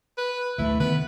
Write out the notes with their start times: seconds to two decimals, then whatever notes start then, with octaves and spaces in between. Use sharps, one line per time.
0.18 B4
0.58 D2 G3 A3 E4
0.80 D3 D#3 B3 B4